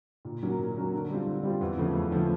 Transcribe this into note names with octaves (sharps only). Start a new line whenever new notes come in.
A#2
F#3 A#3 C#4 F#4
A#2
F#3 A#3 C#4 F#4
D3
G3 C4 F4
D3
G3 C4 F4
E2
C#3 F3 A3 C#4
E2
C#3 F3 A3 C#4